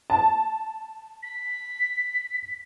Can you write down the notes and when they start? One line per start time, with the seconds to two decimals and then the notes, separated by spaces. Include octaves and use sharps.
0.10 A5
1.23 B6